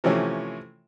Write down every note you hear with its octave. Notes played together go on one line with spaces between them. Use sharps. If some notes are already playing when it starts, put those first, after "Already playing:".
C3 E3 F3 A3 C#4